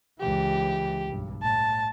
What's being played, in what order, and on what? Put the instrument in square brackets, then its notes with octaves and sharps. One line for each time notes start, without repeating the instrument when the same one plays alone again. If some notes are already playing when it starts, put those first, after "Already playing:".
[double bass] C#2 E3 [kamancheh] G4
[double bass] B1 G2
[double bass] A2 [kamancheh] A5